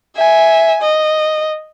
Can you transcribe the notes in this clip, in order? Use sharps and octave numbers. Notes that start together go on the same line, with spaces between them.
E5 G#5
D#5